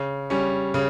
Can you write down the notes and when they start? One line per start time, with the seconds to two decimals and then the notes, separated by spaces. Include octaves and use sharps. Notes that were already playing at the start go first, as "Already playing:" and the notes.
Already playing: C#3
0.30 G3 C#4
0.74 C#3